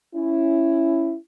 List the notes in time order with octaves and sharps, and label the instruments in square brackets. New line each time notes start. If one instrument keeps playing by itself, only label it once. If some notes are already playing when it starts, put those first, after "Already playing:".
[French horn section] C#4 E4